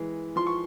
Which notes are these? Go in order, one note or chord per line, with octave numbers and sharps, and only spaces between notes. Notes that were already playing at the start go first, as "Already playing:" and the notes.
Already playing: E3 G#3
F3 C6
C#6